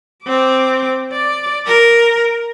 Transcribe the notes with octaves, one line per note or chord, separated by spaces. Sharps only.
C4 D6
D5
A#4